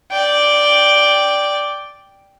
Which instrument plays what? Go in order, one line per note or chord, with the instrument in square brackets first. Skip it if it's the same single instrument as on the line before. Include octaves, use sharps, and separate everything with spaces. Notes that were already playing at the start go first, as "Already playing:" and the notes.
[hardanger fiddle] D5 G5